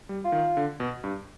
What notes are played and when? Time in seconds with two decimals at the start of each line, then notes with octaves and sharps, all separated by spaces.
0.09 G3
0.25 F4
0.32 D#3
0.57 D3
0.80 B2
1.04 G2